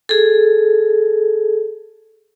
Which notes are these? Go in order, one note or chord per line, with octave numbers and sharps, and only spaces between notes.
G#4 A4